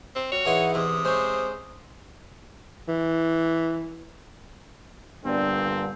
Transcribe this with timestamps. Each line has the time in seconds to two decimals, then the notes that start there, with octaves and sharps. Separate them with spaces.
0.16 C4
0.32 G3 F#4 C#5
0.45 E3 D#4 E4 G#4 D#5 F#5 C6
0.75 E2 C3 D#6
1.05 G#3 C#4 C5
2.88 E3
5.25 G2 A#2 D3 B3 C4 D5